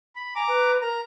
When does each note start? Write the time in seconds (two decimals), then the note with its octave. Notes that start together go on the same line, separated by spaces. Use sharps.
0.16 B5
0.35 G#5 A#5 D6
0.48 B4
0.82 A#4 A#5